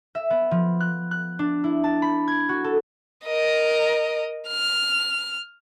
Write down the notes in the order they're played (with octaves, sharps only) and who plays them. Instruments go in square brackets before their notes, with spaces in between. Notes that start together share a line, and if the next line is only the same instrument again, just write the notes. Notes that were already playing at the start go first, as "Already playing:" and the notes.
[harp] E5
B3
F3
F#6
F#6
D4
E4
A5
B5
G#6
F#4
A4
[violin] A#4 D#5
F6